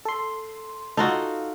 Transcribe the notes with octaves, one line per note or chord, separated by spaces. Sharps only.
A4 C6
D#4 F4 F#4 A4